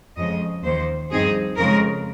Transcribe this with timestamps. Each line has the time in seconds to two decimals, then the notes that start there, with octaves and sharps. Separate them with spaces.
0.16 F2 C#3 F3 G#3 D#5
0.63 D#2 D#3 A#3 C5
1.11 G2 F3 C4 D#4 G#4
1.57 F2 C#3 G#3 A#4